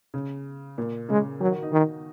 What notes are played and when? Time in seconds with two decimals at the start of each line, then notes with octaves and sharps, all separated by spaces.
0.14 C#3
0.78 A#2
1.09 C#3 G#3
1.41 D#3 F#3
1.52 F#4
1.63 D#4
1.72 D#3